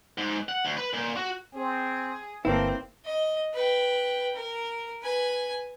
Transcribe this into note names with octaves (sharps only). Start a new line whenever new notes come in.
G#2
F#5
D2
B4
A#2
F#4
C4 G#4
G1 A3 A#3 C4 E4 B4
D#5
B4 G5
A#4
B4 G#5